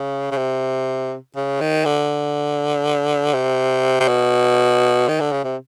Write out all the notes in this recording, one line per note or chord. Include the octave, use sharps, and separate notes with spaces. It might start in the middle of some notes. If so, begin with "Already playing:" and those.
Already playing: C#3
C#3
C3
C#3
D#3
D3
C3
C3
B2
D#3
D3
C#3
C3